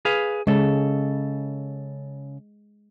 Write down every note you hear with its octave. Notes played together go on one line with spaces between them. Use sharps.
G#4 B4 F5
C#3 G#3 A4